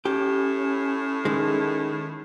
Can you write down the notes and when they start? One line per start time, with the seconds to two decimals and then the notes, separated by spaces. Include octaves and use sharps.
0.05 A2 C#4 G4
1.25 D#3 G#3